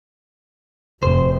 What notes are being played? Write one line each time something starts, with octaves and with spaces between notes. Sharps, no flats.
F1 C5